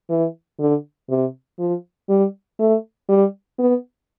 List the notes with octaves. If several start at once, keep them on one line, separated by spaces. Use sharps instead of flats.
E3
D3
C3
F3
G3
A3
G3
B3